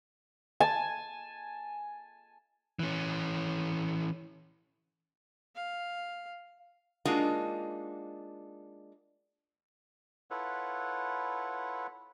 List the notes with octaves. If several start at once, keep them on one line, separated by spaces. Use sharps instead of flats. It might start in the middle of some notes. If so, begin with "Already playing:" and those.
G#5 A5
E3 C#4
F5
G#3 A#3 D4 D#4 F4 F#4
E4 F4 A4 B4 C#5 F#5